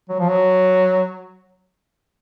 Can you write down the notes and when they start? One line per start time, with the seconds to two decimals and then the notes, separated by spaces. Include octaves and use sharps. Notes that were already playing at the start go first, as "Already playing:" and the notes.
0.09 F#3
0.19 F3
0.28 F#3